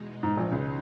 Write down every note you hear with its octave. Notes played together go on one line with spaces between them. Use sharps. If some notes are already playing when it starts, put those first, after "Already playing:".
Already playing: E2 B2 G#3 D#4
G#2
A#1 A#2
C#2 C#3